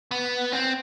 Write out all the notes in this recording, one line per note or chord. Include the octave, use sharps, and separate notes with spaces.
B3
C4